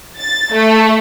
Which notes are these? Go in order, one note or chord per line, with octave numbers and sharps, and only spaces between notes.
A6
A3